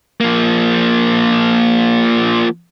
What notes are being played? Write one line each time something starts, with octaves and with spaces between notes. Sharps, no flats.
F3 A#3